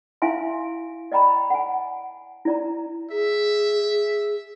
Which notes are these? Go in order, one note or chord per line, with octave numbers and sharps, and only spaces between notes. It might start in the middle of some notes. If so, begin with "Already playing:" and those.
E4 E5 F5 G#5 C6
D5 D#5 G5 A#5 B5
F#5 G#5
E4 D5 A#5
G#4 E5